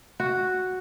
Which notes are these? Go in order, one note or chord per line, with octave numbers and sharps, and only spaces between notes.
F#4